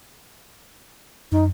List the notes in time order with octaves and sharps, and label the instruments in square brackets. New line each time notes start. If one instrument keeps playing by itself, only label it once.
[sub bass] F#2 [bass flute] D#4